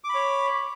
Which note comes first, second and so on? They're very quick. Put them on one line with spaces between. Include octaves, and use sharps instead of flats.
D6 B5 C#5